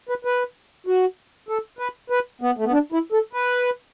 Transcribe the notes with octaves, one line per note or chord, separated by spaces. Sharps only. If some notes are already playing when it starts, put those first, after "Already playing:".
B4
B4
F#4
A4
B4
B4
B3
A3
B3
D4
E4
A4
B4